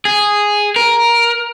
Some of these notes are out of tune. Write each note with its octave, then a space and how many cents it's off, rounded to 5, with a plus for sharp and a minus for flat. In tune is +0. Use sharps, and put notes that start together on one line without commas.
G#4 -5
A#4 +10